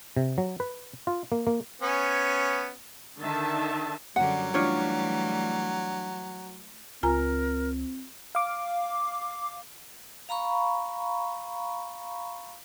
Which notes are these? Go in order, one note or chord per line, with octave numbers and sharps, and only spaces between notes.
C3
F#3
B4
F4
A#3
A#3
B3 C#4 G#5
D3 D#3 E5 A5
F#2 D3 F#3 G3 F#5
E3 G3 A3 D4 F4 C#5
C#2 C4 F4 A#4 G#5 A#5
F5 D6
F5 A#5 B5 C#6